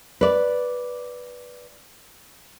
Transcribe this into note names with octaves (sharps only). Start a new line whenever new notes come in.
B4 D5